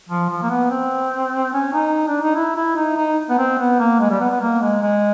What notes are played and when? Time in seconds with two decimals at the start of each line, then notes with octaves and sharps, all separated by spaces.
0.09 F3
0.29 F3
0.42 A#3
0.50 B3
0.70 C4
1.53 C#4
1.73 D#4
2.07 D4
2.22 D#4
2.36 E4
2.56 E4
2.76 D#4
2.96 D#4
3.30 B3
3.38 C4
3.58 B3
3.79 A#3
4.00 G#3
4.10 G3
4.20 B3
4.31 B3
4.40 A#3
4.61 G#3
4.82 G#3